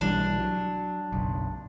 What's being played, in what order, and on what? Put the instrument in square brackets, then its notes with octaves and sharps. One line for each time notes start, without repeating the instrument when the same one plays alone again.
[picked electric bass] B1 E3 G3 [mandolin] D4
[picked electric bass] F#3
F#1 B1